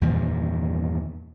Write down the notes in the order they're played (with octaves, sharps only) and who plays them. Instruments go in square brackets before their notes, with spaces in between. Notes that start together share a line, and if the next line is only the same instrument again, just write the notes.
[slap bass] E2 G2 A#2 D#3